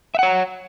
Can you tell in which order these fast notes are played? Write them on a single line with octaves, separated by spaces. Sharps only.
E5 F#5 C#5